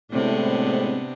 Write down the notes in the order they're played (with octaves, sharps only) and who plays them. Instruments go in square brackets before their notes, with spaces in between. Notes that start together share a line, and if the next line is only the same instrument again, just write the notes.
[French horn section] A2 G#3 C4 [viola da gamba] C3 B3 D4